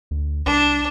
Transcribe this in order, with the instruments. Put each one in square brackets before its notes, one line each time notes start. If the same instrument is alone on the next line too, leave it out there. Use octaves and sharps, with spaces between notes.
[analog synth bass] D2
[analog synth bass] C2 [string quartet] D4